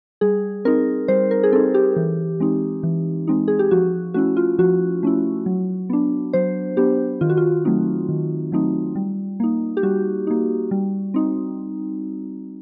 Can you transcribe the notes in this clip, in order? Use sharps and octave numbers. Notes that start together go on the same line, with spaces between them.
G3 G#4
C4 D#4 A#4
G3 C5
A#4
G#4
C4 D#4 A4
G4
E3
G#3 C4 D#4
E3
G#3 C4 D#4
G#4
G4
F3 F#4
A3 C#4 E4 F#4
F4
F3 F#4
A3 C#4 E4
F#3
B3 D4
F#3 C5
B3 D4 G4
D#3 F4
F#4
F4
F#3 A3 C4 D#4
D#3
F#3 A3 C4 D#4
G3
A#3 D#4
G4
G3 F#4
A#3 D#4
G3
C4 D#4